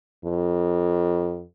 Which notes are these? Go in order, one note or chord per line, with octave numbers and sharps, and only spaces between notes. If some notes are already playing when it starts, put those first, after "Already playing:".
F2